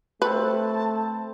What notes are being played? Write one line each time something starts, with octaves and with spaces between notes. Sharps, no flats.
A3 C4 B4 A5 B5 C#6